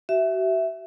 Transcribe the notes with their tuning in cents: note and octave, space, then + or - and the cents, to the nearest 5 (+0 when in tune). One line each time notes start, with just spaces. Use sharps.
F#4 +40 E5 +0